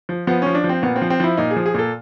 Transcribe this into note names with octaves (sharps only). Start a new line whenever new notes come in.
F3
F3 B3
F3 C#4
D4
F3
C4
A#2 B3
C4
F3
C4
F3 E4
A#2 D#4
G#4
F3
G#4
A#2 A4